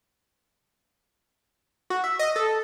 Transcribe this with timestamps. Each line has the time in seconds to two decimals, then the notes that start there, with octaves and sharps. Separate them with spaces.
1.90 F#4
2.04 E5
2.19 D#5
2.36 A4